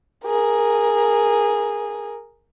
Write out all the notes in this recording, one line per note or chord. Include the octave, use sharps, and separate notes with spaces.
G#4 A#4